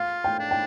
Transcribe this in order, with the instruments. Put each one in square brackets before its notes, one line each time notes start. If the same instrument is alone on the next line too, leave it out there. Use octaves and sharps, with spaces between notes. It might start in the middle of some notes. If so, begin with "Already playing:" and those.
Already playing: [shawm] F4 [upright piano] F5
[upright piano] G5
[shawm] D4
[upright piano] G5